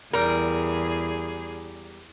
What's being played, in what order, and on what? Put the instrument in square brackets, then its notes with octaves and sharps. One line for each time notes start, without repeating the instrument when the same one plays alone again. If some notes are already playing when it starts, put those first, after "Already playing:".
[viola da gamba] E2 G#4 [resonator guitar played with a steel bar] G3 A#4